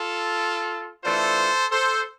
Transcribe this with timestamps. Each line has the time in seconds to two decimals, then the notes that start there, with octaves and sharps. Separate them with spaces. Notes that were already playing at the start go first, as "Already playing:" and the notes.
Already playing: F4 A4
1.04 E3 A3 D4 F4 A4 C5
1.71 A4 C5